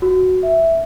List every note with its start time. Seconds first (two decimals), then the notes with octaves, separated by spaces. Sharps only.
0.02 F#4
0.43 E5